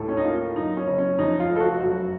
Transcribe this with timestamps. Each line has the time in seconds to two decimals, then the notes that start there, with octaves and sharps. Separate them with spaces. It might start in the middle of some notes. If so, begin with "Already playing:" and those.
Already playing: D#2 A2 A4
0.08 C#4
0.17 D#4
0.24 A#3 F4
0.55 F#2 D#4
0.77 C#4
0.87 F#1
0.98 C#4
1.19 F2 D#4
1.40 F4
1.50 F1
1.56 A4
1.60 F#4
1.80 F#2 F#4